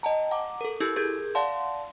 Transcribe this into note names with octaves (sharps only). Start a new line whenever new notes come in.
D#5 G5 A5 A#5
F#5 A#5 D6
A4 A#4
E4 G4 A4 E6 G6 G#6
G#4 A#4 G6 G#6
D5 F5 F#5 A5 C6